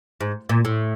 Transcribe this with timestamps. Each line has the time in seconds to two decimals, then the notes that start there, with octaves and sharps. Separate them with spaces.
0.21 G#2
0.49 A#2
0.65 A2